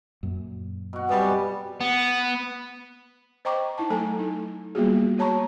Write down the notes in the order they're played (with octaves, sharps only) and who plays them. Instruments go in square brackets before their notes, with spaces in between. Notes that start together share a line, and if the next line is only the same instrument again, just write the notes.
[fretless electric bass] F#2 A#2
[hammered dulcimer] B2 F#4
[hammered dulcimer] C3 G#3 [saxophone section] G3 B3
[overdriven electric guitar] B3
[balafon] C5 D#5 G5 A#5 C#6 D6
D#4 E4 A5
F#3 A3 A4 G#5 A#5
D#4
G3 A#3 B3 F4 F#4 G#4
G#3 F#4 C#5 A5 A#5 C#6